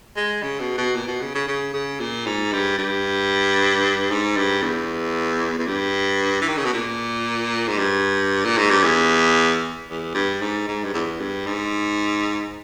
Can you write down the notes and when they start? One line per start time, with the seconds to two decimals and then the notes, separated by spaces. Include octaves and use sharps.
0.17 G#3
0.43 C#3
0.60 B2
0.78 B2
0.95 A#2
1.07 B2
1.21 C#3
1.35 C#3
1.48 C#3
1.73 C#3
2.00 A#2
2.26 G#2
2.53 G2
2.78 G2
4.11 G#2
4.37 G2
4.62 E2
5.59 E2
5.68 G2
6.41 E3
6.49 D#3
6.57 C#3
6.65 B2
6.73 A#2
7.68 G#2
7.78 G2
8.45 A#2
8.58 G#2
8.70 G2
8.84 E2
9.89 E2
10.14 G2
10.41 G#2
10.68 G#2
10.84 G2
10.94 E2
11.20 G2
11.46 G#2